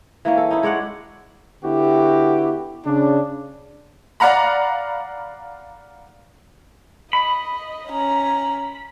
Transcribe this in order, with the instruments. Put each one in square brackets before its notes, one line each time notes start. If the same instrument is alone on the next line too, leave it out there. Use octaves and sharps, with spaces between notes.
[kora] E3 A#3 C#4
A4
D#4 E4
G#3 C#5 D5 F#5
[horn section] D3 B3 E4 F#4 G4
C#3 D4
[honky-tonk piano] D5 F5 F#5 A#5 B5
[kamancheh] D#5 [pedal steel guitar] B5
[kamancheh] C#4 A#5